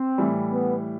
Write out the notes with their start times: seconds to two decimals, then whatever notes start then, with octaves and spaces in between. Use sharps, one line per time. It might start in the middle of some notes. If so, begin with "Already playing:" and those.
Already playing: C4
0.18 A2 E3 G3
0.51 B3